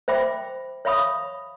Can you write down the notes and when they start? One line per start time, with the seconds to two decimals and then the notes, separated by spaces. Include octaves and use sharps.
0.08 C5 E5 G5 B5 D6
0.85 C#5 E5 F5 B5 C#6 D#6